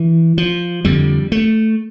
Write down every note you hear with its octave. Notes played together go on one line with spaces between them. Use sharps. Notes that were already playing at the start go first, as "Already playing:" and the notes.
Already playing: E3
F3
F2 D3 G3
A3